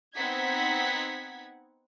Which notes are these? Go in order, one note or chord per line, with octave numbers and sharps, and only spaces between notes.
B3 C4 D#4 F#5 G#6 B6